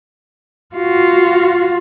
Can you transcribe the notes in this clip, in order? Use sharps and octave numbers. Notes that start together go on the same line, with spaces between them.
F4 F#4